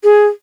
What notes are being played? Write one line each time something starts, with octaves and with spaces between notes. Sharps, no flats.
G#4